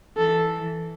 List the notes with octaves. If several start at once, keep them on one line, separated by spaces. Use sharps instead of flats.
E3 A4